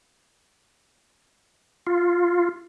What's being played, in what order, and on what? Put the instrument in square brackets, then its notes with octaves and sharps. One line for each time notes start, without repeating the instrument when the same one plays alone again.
[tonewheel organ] F4